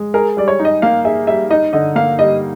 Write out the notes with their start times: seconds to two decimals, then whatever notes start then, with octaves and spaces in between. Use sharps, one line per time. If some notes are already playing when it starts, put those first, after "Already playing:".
Already playing: G#3
0.14 G#4 A#4
0.37 G3 D5
0.48 C#5
0.59 D#4
0.65 D#5
0.82 A#3 F5
1.04 G#4 E5
1.27 G3 E5
1.50 D#4 D#5
1.73 D3 D#5
1.95 A#3 F5
2.19 G3 D#5